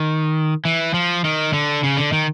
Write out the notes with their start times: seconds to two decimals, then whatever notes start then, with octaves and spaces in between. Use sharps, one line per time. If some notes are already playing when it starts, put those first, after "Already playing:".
Already playing: D#3
0.65 E3
0.94 F3
1.25 D#3
1.53 D3
1.83 C#3
1.97 D3
2.12 D#3